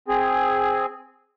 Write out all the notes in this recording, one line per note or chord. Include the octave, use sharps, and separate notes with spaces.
C4 G#4